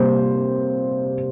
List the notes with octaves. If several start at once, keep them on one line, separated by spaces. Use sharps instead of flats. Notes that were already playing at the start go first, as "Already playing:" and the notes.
Already playing: C3 G3 A#3 C5